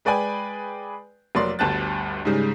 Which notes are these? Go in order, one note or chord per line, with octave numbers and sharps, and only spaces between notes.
G#3 B4 D5 G5 G#5
F1 F#3 A#3 D5 C6
G1 D2 G2 A5 F#6 A6
G#2 C#3 G3 G#3